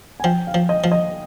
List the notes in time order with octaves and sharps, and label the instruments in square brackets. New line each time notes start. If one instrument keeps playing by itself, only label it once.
[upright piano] G#5
[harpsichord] F3 [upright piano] G5
[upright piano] F5
[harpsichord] F3
[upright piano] D#5
[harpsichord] F3
[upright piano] D#5